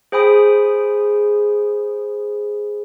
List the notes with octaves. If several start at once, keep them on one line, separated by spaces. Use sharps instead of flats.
G#4 C5 G5 G#5 B5 D#6